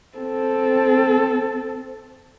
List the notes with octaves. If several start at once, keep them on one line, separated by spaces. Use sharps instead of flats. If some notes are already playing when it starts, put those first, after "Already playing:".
C4 A4